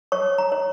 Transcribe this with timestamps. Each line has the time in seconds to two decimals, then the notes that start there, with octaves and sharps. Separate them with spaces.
0.12 C#5 C#6
0.38 A#5
0.52 C#5